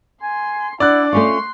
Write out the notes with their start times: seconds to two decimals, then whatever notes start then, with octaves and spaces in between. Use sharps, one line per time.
0.23 G#5 C6
0.80 D4 E4 D5 F#5 F#6
1.13 A3 C#4 F4 C6 C#6